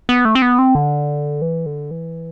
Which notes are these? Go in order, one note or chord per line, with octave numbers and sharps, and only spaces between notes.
B3
A3
C4
B3
C4
D3
E3
D3
E3